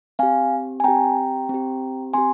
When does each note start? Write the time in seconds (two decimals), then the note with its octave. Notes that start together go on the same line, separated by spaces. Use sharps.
0.19 C4 G4 F5 G#5
0.80 G#5
0.84 C4 G4 G5 A#5
1.49 C4 G4
2.13 C4 G4 G#5 C6